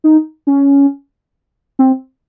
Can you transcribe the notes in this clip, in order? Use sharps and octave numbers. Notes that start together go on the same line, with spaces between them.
D#4
C#4
C4